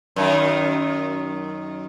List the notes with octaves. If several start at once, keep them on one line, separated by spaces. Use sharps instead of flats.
F#2 D#3